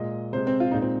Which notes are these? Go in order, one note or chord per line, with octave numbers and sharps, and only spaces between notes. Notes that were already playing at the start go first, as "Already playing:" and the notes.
Already playing: A#2 G#3 D#5
C3 G#3 C5
C4
F4
A#2 G#3 D#4
C4